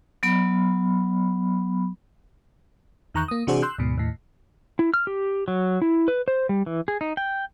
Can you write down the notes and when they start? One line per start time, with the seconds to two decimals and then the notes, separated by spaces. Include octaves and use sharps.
0.23 F#3 B3 B5
3.14 E2 D#3 A#5 C#6 F#6 G6
3.28 A#3 D#6
3.47 C3 E3 D4 F#4 G#4 C5
3.62 C6 E6 F#6 G6
3.78 D2 G#2 B2
3.98 D#2 A2
4.79 E4
4.94 F6
5.07 G4
5.48 F#3
5.82 E4
6.08 B4
6.28 C5
6.49 G3
6.66 E3
6.88 G#4
7.01 D#4
7.17 G5